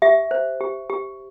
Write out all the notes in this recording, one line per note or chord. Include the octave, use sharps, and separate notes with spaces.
G4 E5
C5
G4
G4